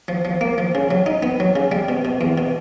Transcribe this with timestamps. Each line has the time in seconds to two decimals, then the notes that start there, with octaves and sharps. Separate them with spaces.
0.08 F3
0.25 F3
0.41 A#3
0.58 F3
0.75 C#3
0.91 F#3
1.06 D#4
1.23 B3
1.40 F#3
1.56 C#3
1.72 G3
1.89 B2
2.05 B2
2.21 E2
2.38 B2